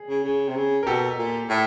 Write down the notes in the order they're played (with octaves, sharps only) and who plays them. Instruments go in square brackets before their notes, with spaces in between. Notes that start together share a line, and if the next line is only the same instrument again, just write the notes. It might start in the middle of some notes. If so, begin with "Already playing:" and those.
Already playing: [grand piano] G#4
[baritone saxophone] C#3
C#3
C3
C#3
[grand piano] A#4
[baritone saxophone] B2 [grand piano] G4 A4
[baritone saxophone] A#2
A2